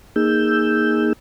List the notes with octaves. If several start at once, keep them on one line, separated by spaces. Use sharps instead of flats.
A#3 D#4 G#4 E6 G6